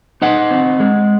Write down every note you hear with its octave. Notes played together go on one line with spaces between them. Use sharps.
D#4 D#5 F#5
C4
G#3